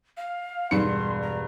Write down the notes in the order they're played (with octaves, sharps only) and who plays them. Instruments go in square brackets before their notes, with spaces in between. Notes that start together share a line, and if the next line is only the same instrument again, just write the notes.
[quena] F5
[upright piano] E1 G2 C#7 [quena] C6
[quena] A#5